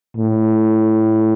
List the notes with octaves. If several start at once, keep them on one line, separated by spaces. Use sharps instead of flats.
A2